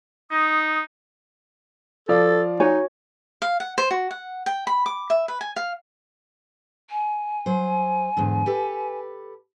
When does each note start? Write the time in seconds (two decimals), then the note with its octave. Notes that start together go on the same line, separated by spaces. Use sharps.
0.31 D#4 D#6
2.09 F3 A4 D5 F5
2.60 D#4 F#4 C#5 G#5
3.42 F5
3.60 F#5
3.78 C5
3.91 F#4
4.11 F#5
4.46 G5
4.67 B5
4.86 D6
5.10 E5
5.28 B4
5.41 G#5
5.56 F5
6.90 G#5
7.46 F#3 C5
8.17 E2 G#2 D3
8.46 G4 A4 B4